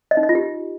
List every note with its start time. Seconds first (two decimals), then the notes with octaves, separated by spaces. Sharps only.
0.11 D#5
0.17 D#4
0.23 D#5
0.29 F4
0.35 G4